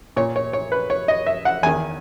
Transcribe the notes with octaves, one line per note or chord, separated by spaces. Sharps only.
A#2 C#5
C#5
C#5
B4
C#5
D#5
E5
F#5
E2 D#3 G#5